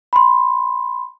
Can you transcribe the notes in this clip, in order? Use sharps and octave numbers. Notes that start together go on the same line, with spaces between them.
B5 C6